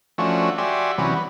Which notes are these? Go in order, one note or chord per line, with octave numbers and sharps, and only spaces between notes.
F3 A3 C#4 D4 F#4
F#4 G4 D5 E5 G#5 C6
C3 E3 F#3 G3 B3 C#4
B4